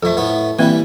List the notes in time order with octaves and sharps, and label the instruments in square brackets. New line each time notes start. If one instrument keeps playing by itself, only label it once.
[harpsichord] F2 A3 [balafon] A4 E5
[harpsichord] A2 A3 B3
[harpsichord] E3 G3 E4 [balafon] A#3 C4